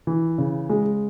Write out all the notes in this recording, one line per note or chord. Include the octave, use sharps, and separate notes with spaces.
E3
C#3
G#3